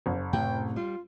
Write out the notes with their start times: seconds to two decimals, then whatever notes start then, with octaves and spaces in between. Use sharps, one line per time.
0.06 F#1
0.33 A2 C3 G5
0.76 G3 F4